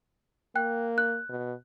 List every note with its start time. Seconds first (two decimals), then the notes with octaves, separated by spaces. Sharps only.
0.55 A#3 G5 F#6
0.98 F#6
1.29 B2